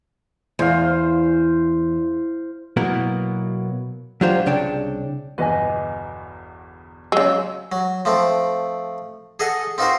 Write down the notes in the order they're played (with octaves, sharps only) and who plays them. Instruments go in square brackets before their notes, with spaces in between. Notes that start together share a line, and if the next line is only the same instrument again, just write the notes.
[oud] E2 [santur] C5 F5
[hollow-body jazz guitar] B2 F#3 A#3 B3 E4 A#4
F#3 D4 F4 G4 C5
C2 C#3 D4 C#5 G5
[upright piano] G1 E2 B2 [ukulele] B4 D#5 G#5
[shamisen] C#3 G#3 [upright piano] F#3 [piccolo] E6
[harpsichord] F#3
F3 A3 C4
G#4 A4 D#5 F#5 G#5
C4 D#4 F4 F#4 A#4 C5